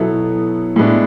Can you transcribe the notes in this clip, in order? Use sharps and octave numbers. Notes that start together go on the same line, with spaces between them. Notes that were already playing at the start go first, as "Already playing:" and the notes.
Already playing: B2 F#3 B3 E4 A4
A2 G#3 B3 D4